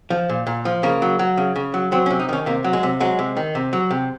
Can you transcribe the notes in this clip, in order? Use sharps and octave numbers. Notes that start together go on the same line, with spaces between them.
F3
A#2
A#2
F3
C#3 A#3
F#3
F#3
C#3
C#3
F#3
F#3 C4
C#4
C3
D#4
D#3 C#4
C3 A#3
F#3
G#3
C3
F#3 G#3
C3
D#3
C3
F#3
C3